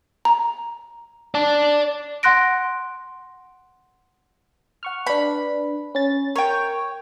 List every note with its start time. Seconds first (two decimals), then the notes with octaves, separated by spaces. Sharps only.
0.25 A#5
1.35 D5 A5
2.23 F#5 C6 F#6 A#6 D7
4.83 F#5 C#6 F6
5.07 D4 B4 B5
5.95 C#4 A6
6.36 A#4 C#5 G5